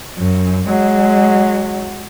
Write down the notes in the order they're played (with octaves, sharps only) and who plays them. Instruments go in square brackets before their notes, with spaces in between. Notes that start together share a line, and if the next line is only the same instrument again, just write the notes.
[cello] F#2
[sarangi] F#3 [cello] G#3